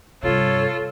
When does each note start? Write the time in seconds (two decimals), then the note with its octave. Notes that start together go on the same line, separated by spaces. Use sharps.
0.23 G2 C3 F4 A4 C#5